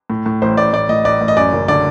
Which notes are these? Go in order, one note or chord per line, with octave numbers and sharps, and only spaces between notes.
A2
A2
A1 C5
A1 D5
A2 D5
A2 D#5
A1 D5
A1
D#5
F#2 D5
F#1
D3 D5